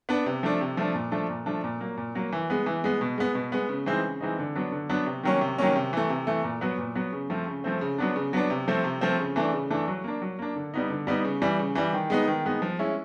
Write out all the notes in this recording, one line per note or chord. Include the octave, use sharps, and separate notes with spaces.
B3 D4
C3
F3 A3 D4
C3
F3 A3 D4
A#2
F3 A3 D4
A#2
F3 A3 D4
A#2
F#3 A#3
A#2
F#3 A#3
E3
G#3 B3
E3
G#3 B3
B2
G#3 B3
B2
G#3 B3
C#3
E3 G#3 C4 D#4
C#3
E3 G#3 C4 D#4
D3
F#3 B3 D4
D3
F#3 B3 D4
C3
D#3 F#3 A#3 C#4
C3
D#3 F#3 A#3 C#4
C3
E3 A3
C3
E3 A3
A#2
F#3 B3
A#2
F#3 B3
C#3
F3 A3 C4
C#3
F3 A3 C4
C#3
F#3 B3 D4
C#3
F#3 B3 D4
C3
F3 A3 C4
C3
F3 A3 C4
C#3
E3 A3 D4
C#3
E3 A3 D4
F#3
A#3 D4
F#3
A#3 D4
D3
G3 B3 D#4
D3
G3 B3 D#4
C#3
E3 G3
C#3
E3 G3
D#3
G#3 B3 D#4
D#3
G#3 B3 D#4
F3
G#3 C#4 E4